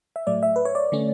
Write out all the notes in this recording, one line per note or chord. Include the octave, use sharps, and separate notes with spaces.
E5
A2 F#3 A3 D5
E5
B4
C#5
D5
D3 A3 C#4